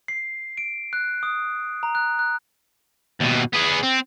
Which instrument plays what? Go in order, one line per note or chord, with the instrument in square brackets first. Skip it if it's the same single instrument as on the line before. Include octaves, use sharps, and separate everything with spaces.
[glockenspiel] C7
D7
F#6
D#6
A#5
F#6
F#6
[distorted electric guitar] D#2 B2
B3 G#4
C4